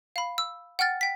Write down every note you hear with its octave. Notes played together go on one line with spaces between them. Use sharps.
F5 B5
E6
F#5 G5 F6 A6
G5 B6